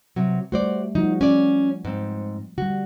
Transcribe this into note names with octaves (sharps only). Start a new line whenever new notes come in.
C3 F#3
G3 A3 F#4 C5 D5
F3 G3 D#4 F#4
C#4 D5
G#2 C4
D3 G3 F#4